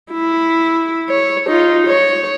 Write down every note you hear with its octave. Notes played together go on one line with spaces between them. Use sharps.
E4
C#5
D#4 F4
C#5